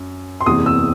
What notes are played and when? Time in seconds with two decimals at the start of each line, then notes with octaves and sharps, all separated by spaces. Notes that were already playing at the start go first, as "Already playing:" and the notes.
Already playing: F#2
0.41 C6
0.46 F#1 E2 C3 E3 D#6
0.66 E6